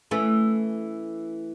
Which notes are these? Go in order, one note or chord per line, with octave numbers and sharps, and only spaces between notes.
E3 A3 C#4